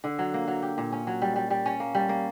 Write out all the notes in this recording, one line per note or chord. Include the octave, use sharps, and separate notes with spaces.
D3
F#3
A#3
F#3
G4
A#2
C#4
F#3
G3
G3
G3
C#4
A#3
G3
A#3